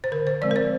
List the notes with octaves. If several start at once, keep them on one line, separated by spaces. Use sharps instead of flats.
C5
D3 A#4
C5
F3 G#3 C4 D5
A#4
C5